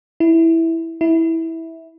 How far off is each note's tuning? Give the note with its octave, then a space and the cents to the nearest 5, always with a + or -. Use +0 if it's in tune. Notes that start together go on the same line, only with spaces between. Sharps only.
E4 -5
E4 -15